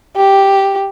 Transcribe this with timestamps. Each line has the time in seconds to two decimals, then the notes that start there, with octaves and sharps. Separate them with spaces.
0.17 G4